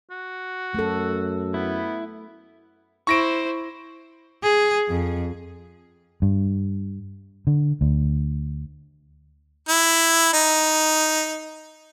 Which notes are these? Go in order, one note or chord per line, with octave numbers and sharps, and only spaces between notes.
F#4
F#2 A3 A4
B3 E4
E4 C5 C#6 A#6 D7
G#4
F2
G2
D3
D2
E4
D#4